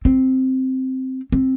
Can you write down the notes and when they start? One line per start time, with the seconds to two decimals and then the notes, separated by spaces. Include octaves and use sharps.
0.05 C4
1.32 C4